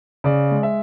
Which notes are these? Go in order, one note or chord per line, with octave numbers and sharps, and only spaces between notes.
C#3 D5
G#3
E5